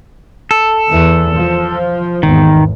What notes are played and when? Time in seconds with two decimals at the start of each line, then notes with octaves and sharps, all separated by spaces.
0.51 A4
0.90 E2 E3
1.34 F3
2.23 G#1 E2 D#3